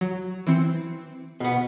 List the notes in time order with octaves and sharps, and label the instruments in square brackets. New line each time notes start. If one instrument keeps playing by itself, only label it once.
[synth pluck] F#3
E3 C4 C#7
[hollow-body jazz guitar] B2 B3